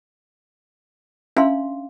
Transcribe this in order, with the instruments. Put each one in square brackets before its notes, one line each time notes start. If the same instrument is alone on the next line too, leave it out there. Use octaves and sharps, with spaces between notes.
[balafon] C#4 E5 [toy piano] D4 F5 C6